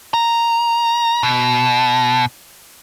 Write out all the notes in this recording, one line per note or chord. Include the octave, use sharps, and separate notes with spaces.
A#5
B2